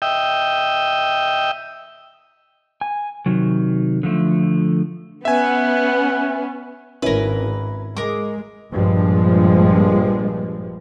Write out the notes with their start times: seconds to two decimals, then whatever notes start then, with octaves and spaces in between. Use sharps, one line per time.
0.02 D#5 E5 G5
2.81 G#5
3.26 C3 D#3 F#3
4.03 D3 F3 A3
5.25 B3 C#4 E5 F#5 G#5
7.02 G#1 C#4 E4 A#4 B4
7.97 G#3 A#4 D6
8.72 A#1 G2 F3 G#3